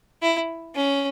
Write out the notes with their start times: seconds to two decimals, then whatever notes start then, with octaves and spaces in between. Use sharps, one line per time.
0.22 E4
0.75 C#4